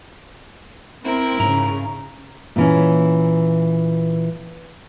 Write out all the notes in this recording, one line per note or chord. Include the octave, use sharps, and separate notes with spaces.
C4 E4 A#4
G#2 C#3 A#5
A#2 E3 C#4